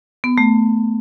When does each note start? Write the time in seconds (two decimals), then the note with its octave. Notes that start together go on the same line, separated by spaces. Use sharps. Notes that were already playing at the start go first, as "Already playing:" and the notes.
0.24 B3
0.38 A3